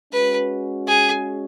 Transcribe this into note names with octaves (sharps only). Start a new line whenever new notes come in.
G#3 C#4 F#4 B4
G#4